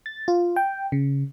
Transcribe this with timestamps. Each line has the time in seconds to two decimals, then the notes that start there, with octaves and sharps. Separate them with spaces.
0.06 A6
0.28 F4
0.56 G5
0.92 C#3